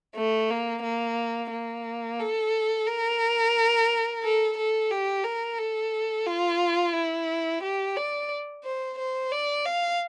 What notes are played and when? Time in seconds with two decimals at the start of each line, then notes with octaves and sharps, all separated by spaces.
0.15 A3
0.50 A#3
0.83 A#3
1.51 A#3
2.19 A4
2.87 A#4
4.23 A4
4.57 A4
4.91 G4
5.24 A#4
5.58 A4
6.26 F4
6.94 E4
7.63 G4
7.96 D5
8.64 C5
8.98 C5
9.31 D5
9.65 F5